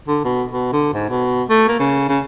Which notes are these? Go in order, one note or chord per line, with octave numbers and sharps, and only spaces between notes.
D3
B2
B2
D3
G#2
B2
A3
A#3
C#3
C#3